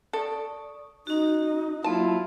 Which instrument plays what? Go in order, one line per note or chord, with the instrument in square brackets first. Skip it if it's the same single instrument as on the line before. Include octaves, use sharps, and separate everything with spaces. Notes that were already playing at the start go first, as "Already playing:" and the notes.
[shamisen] A4 [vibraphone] D5 C#6 D#6
[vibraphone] C#4 F#4 [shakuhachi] D#4
[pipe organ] F#3 E4 F4 [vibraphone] A#3 C6 [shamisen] A5